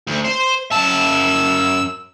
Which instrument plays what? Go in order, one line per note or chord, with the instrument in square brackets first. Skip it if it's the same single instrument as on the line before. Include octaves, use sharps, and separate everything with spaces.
[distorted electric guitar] D2
C5
[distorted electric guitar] F#2 A5 [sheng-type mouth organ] E6